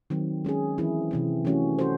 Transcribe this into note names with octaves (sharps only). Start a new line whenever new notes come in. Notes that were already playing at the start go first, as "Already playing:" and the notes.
D#3 F#3 C4
G#3 C#4 G#4
E3 C4 E4 G#4
C3 E3 C4
E3 A3 C#4 F#4
C#4 F#4 A4 C5